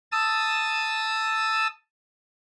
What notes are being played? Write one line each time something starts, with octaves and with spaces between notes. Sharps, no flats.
A5 D#6 E6